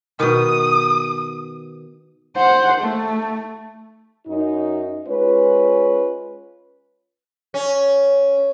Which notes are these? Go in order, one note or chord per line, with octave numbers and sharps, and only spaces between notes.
B2 D#3 D#6
C5 F#5
A3
F#2 D#4
G#3 C#4 F4 B4
C#4